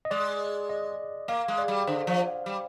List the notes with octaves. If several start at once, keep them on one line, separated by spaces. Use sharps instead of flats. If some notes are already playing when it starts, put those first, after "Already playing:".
D#5
G#3 D5
D#5
A#3 F5
G#3
D5
G3
D3 C5
F3
G3